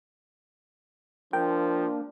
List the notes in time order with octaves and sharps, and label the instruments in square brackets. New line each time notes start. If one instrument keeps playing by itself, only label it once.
[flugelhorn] F3 [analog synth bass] A#3 [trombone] D4 [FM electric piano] G5